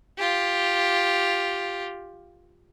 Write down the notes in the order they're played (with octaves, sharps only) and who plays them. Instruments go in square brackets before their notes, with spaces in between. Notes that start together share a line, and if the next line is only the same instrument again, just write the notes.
[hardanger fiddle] F4 G4